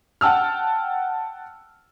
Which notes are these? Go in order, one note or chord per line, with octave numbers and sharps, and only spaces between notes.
F#5 G5 A5 E6 F6